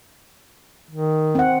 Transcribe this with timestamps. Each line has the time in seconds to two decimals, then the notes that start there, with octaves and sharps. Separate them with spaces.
0.91 D#3
1.35 C4 F#5